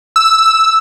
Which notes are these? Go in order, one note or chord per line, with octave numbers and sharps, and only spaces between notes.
E6